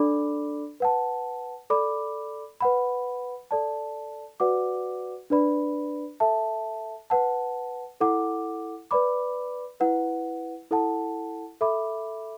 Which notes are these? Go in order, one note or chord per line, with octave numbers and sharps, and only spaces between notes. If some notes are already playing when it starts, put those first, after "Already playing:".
Already playing: D4 A4 D5 B5 D6
B4 F#5 A5
A4 D5 B5 D6
B4 F#5 B5
A4 D5 A5
F#4 B4 D5 F#5 D6
D4 B4 D5 B5
A4 E5 A5
B4 F#5 A5
E4 A4 F#5 D6
B4 D5 B5 D6
E4 B4 F#5
E4 A4 F#5 A5
A4 E5 B5 D6